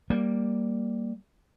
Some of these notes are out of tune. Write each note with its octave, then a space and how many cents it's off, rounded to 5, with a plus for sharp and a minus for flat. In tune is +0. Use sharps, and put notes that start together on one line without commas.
G3 +0 A#3 +0